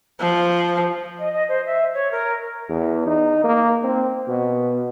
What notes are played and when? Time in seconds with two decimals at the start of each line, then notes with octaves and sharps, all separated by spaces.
0.21 F3
1.18 D#5
1.32 D#5
1.48 C5
1.65 E5
1.93 C#5
2.11 A#4
2.69 E2
3.07 D#4
3.44 A#3
3.84 C4
4.28 B2